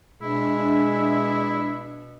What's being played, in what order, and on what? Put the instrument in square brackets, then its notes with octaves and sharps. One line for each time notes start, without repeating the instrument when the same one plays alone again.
[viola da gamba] B2 [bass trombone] G#3 [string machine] D4 E5 [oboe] E4